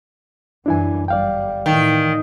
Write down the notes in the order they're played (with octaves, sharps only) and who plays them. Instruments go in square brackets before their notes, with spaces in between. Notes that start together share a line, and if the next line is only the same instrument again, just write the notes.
[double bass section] F#2 E3 G3 [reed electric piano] D4 E4 G#5
[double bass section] G1 G3 [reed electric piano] D5 F5 G5
[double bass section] A2 E3 [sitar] D#3